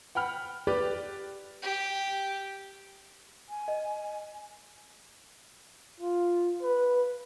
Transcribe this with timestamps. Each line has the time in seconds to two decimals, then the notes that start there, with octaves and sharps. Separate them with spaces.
0.15 F#5 G5 B5 F6
0.67 G4 B4 D5 G5
1.62 G4
3.49 G#5
3.68 D#5
6.00 F4
6.62 B4